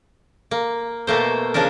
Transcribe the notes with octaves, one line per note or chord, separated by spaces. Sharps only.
A#3
B2 A3 A#3 C5
C#3 F3 C#4 D4 A#4